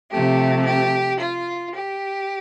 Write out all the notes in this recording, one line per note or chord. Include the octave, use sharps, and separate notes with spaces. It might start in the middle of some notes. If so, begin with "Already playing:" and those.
C3 F3 A3 G4
G4
F4
G4